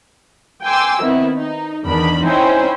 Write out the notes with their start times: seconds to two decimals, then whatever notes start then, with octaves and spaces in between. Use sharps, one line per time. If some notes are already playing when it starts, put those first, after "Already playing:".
0.63 G5 G#5 C6 D6 E6
1.02 D#3 B3 C4 E4
1.37 D#4
1.87 E2 D#3 D4 B5
2.23 C#4 D#4 E4 C5 G5 G#5